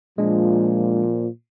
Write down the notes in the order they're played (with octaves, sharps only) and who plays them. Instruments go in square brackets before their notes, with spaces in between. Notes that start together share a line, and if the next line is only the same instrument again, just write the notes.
[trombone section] A#2 F3 [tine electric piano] G#3 D4